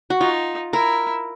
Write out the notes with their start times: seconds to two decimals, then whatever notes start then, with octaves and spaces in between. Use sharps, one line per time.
0.10 F#4
0.21 D#4 F4
0.73 E4 A#4